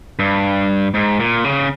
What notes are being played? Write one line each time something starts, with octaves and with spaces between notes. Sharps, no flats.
G2
G#2
A#2
C#3